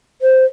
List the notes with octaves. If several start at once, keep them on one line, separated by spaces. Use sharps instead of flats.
C5